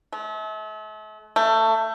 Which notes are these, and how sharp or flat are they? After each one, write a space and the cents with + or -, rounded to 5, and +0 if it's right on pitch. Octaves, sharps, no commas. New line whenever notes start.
A3 -40
A3 +20